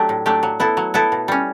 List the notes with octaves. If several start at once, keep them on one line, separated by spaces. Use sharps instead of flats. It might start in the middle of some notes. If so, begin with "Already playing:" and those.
Already playing: F#3 A3 D4 G4
A2
F#3 A3 D4 G4
F#3
B3 E4 A4
F#3
B3 E4 A4
B2
G3 C#4